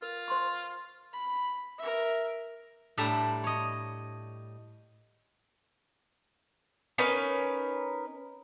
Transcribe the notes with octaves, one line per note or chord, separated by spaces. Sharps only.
F4 A#4
C5 C6 C#6
B5
A#4 E5
A2 G3 D4 A4 E5 A#5
C#5 D#5
C#4 D#4 A#4 B4